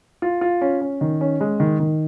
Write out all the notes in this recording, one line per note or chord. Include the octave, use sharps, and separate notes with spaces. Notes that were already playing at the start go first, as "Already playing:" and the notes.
F4
F4
C#4
C#4
D#3
C#4
G#3
D#3
D#3